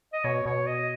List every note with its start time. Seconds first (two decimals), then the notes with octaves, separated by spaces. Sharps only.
0.13 D#5
0.24 B2 C#5
0.46 B2 C#5
0.67 D#5